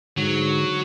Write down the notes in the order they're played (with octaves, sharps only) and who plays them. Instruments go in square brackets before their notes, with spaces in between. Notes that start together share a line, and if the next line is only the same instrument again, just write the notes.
[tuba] G#2 [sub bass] D3 [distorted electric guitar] F#3